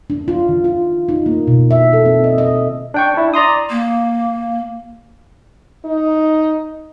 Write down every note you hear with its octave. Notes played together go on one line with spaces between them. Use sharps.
D4
F4
D#3
F4
D#4
A#3
B2
E5
A4
C4
D#5
D#5
D4 G5 C#6
D4 E4
D5 A#5 C6 D#6
A#3
D#4